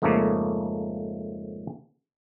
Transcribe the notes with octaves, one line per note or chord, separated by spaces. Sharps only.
F2 G#2 C#3 A3 A#3